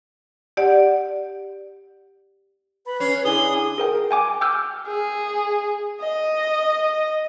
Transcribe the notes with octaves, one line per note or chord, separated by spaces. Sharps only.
G4 D5 F#5
B4 B5
C#4 C7
D3 E4 G#4 D#6 G7
G#4 A#4 G5
G5 G#5 D6
G5 D6 E6 F6 G6
G#4
D#5